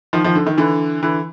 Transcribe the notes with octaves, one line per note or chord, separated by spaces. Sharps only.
D#3 F3
D#3 F3
D3
D#3
D3 E3
D3 E3